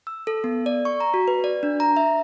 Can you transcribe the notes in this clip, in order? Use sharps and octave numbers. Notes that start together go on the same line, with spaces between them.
E6
A4
B3
D5
C#6
A#5
F#4
B4
D5
D4
A#5
E5